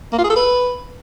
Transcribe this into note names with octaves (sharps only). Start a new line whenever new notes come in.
A#3
F4
G#4
A4
B4